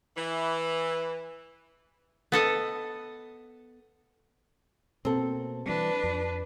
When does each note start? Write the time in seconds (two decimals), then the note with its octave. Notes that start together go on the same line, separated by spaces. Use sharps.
0.17 E3
2.32 B3 A4 D#5
5.05 B2 A#3 C4 A4
5.66 E3 G3 D4 B4
6.04 F2